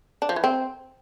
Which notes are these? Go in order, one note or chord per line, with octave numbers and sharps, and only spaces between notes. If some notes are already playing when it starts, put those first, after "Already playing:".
D4
F3
E3
C4